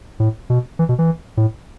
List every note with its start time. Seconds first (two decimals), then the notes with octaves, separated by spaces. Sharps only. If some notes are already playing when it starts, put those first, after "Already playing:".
0.20 A2
0.50 B2
0.79 E3
0.89 B2
0.99 E3
1.37 A2